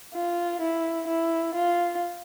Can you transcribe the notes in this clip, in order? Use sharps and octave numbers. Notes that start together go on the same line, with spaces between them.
F4
E4
E4
F4